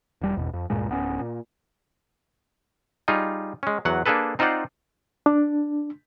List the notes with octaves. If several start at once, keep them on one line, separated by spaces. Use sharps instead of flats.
E1 G3
G#1 E2 B2
F2
D1 G2 A#2 G#3
D1 B3 C#4
A#2
G3 D#4 F4 G#4
G#3 C#4
E2 F#3 F#5
A#3 D4 G#4 A4 B4
C4 D#4 F4 C5 D5 F#5
D4